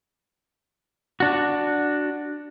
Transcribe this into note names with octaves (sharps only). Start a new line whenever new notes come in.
D4 F#4